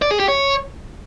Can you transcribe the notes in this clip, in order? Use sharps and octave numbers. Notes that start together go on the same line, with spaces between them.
D5
G#4
G4
C#5